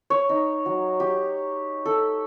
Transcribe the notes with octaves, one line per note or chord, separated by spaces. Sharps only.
C#5
D#4
F#3
G4
A4